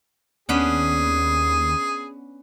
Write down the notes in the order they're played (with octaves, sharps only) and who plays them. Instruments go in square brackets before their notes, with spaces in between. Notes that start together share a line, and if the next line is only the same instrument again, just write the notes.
[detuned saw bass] D#2 [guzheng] B3 C#4 D4 [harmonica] G#4